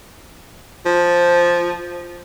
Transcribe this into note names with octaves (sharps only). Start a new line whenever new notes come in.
F3